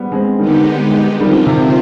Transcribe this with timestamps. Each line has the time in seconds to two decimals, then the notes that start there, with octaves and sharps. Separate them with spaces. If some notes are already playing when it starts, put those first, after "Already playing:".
Already playing: G3 B3
0.12 G#3 C4
0.39 D3 D#3 G3 G#3 B3 D#4 G4
1.20 D3 D#3 F3 G3 C4 F4
1.46 C3 D#3